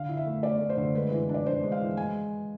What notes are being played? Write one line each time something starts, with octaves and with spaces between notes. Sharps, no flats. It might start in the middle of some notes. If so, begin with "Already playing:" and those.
Already playing: D3 F5
E4
E5
A3
A3 D5
A3
C5
D3
G#3 B4
E3
D4
D5
D4 C5
G#3
F5
E3
G#3 G#5